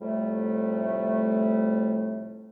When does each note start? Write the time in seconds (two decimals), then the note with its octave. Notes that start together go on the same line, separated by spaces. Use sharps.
0.01 F2 A2 C3 G3 A3